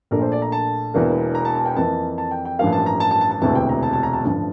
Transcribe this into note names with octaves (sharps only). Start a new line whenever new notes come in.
A#1 A#2 A3 D4 A#4
C5
D5
A#5
A5
E1 E2 E3 A#3 D4
A#5
A5
A5
G5
F2 E3 A#3 A5
A5
G5
G5
A1 G2 F3 A#3 F5
A5
A#5
A5
A5
A5
A5
E1 D2 C3 E3 A5
G5
A#5
A5
A5
A#5
A5
A1 G2 D3 F3 A5